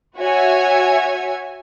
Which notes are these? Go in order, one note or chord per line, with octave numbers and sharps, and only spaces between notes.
F#4 C#5 E5 G#5